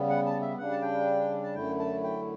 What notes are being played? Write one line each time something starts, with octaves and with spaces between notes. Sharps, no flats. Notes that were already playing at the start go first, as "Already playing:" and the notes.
Already playing: C#3 G3 B3
F#5
A5
E5
C#3 G3 D4 F#5
A5
G5
A5
F#2 D3 A3 E4 G5
A5
G5